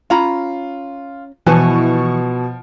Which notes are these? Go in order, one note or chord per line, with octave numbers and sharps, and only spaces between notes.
C#4 F4 A#5 B5
B2 E3 F3 B4 G#5 A5 C#6